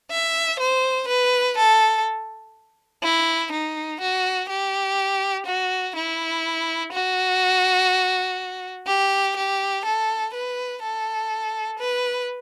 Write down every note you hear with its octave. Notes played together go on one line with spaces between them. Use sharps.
E5
C5
B4
A4
E4
D#4
F#4
G4
F#4
E4
F#4
G4
G4
A4
B4
A4
B4